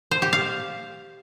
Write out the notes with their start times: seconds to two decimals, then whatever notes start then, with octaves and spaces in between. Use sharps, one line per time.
0.11 C5
0.22 G4
0.33 F5